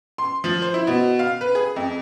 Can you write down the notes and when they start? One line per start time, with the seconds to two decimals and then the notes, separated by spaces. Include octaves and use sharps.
0.18 C6
0.44 F3
0.62 C5
0.74 E4
0.87 B2
1.19 F5
1.41 B4
1.55 G#4
1.76 F2